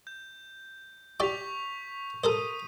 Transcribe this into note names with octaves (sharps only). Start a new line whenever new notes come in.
G6
G4 D5 C#6 D6 B6 F7
A4 A#4 C5 D#6 D#7